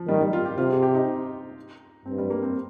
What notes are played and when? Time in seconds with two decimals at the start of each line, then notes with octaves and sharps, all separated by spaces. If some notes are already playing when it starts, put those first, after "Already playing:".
Already playing: F3
0.08 D#3 G3
0.21 G3
0.33 F4
0.45 G4
0.58 C3 F4
0.70 G#4
0.83 G4
0.95 D#4
2.05 G2 C4
2.18 G3
2.30 A#3
2.42 C4